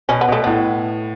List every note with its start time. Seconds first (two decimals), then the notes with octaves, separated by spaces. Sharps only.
0.09 B2 C#4
0.21 B3
0.28 B2 A3
0.44 A2 B3